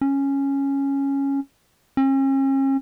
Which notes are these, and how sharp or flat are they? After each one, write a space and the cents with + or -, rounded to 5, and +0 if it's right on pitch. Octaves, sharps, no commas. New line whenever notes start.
C#4 -5
C#4 -40